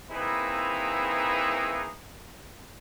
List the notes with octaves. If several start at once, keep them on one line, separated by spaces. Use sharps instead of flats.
A#3 C4 D#4 E4 G#4 B4